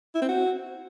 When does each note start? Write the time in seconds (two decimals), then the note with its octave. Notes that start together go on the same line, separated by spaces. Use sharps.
0.15 E4
0.22 C4
0.29 F#4